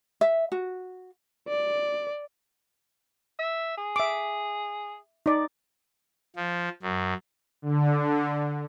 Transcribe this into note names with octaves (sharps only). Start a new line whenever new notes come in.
E5
F#4
D5
E5
G#4
E5 D6
D#4 D5
F3
F#2
D3